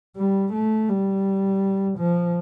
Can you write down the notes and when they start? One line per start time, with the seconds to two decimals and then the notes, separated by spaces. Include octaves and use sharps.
0.16 G3
0.53 A3
0.89 G3
1.98 F3